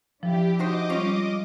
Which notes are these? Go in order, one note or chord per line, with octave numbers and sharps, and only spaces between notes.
F3 D4 E4 G4
D#4 F#4 C5 D#5 D6
G3 G#3 C#4 F4